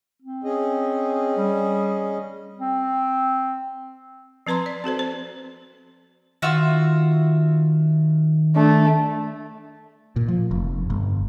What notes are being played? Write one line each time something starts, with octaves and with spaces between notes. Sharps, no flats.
C4
C#4 G#4 D#5
G3
C4
F3 C4 B4 A#5 C6
D5
C4 F#4 A4 C5
C4 C5
D#3 F4 F#4 E5
A3 D4
A#2
F3
F1
G1